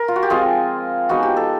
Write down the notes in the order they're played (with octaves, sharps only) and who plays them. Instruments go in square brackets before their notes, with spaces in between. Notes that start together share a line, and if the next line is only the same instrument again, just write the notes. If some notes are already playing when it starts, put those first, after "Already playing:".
Already playing: [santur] A#4
F4
F#4
G4
F3 G#3 C4 F4 G#4
F3 G#3 B3 D#4 F#4
G4
A4